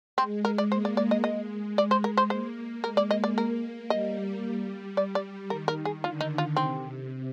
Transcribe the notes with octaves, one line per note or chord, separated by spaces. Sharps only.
G#3 C4
A#4
D5
A#3 C5
D5
D5
D#5
G#3 D#5
G#3 D5
C5
A#4
C5
A#3 C5
G#3 A#4
D5
D#5
D5
A#3 A#4
G3 D#5
D5
D5
D#3 A#4
A#4
G#4
D3 F4
D#4
F4
C3 C4